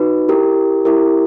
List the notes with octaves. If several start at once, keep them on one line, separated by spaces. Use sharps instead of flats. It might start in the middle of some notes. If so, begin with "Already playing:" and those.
Already playing: D#4 F#4 B4
E4 G4 A#4
E4 G4 A#4